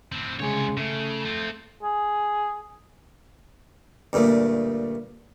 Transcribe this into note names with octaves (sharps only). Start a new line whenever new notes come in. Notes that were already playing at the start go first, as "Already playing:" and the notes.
A2 C4
C2 C#3 G#3 C#5
C#3 A3
C4 F4
G#4
D2 G2 A#2 A3